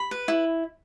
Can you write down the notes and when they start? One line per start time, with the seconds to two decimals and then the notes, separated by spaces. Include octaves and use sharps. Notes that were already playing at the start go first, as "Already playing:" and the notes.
Already playing: B5
0.11 B4
0.28 E4